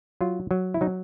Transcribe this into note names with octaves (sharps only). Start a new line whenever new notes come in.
F#3 F4
F#3
E4
F#3 D#4